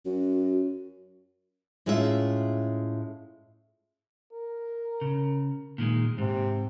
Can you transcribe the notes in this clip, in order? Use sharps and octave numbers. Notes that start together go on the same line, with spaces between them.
F#2 F#4
A2 G#3 C#4 F4 G#4 E5
A#4
C#3
A#2 D#3 G#3
G#2 C3